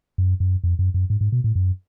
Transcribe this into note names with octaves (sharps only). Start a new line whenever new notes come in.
F#2
F#2
F2
F#2
F#2
G#2
G#2
B2
A2
F#2